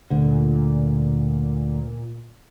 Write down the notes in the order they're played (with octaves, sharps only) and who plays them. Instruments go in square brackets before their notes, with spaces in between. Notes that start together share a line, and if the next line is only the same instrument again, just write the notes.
[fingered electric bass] D2 D3 [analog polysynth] A#2